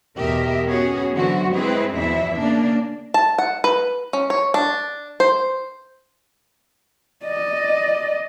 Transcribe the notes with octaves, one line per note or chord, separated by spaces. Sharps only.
E2 B2 G4 A#4 D#5 E5
B3 C#4 F#4 G#4
D3 E3 F#3 F#4 C5
G#3 C4 E4 G#4 B4
E2 B2 E3 F3 E4 E5
C#3 A#3 D4
A5
F#5
B4
C#4
C#5
D4
C5
D5 D#5